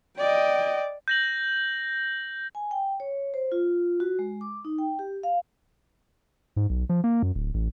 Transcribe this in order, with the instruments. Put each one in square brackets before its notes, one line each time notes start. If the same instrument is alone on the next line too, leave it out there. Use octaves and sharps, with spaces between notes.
[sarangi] D5 [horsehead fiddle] D#5 G5
[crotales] G6 A#6 F#7
[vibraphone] G#5
G5
C#5
C5
F4
F#4
G#3
D6
D#4
G5
G4
F5
[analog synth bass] G#2
B1
F3
A#3
F#2
D1
A1